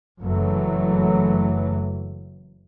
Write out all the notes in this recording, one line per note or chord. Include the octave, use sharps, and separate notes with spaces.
F#1 F#2 E3 F#3 A3